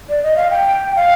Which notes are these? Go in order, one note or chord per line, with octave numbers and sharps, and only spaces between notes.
D5
D#5
F5
G5
F5